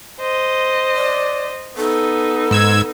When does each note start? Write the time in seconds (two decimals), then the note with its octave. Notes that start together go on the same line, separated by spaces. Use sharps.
0.20 C5 D#5
0.95 D5
1.77 B3 D#4 A4
2.51 G#2 E6 G#6